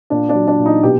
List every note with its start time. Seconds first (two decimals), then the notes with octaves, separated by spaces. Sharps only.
0.10 A#2 D4
0.29 D4
0.35 F#3
0.48 D4
0.59 A#2
0.66 D#4
0.83 B2 G4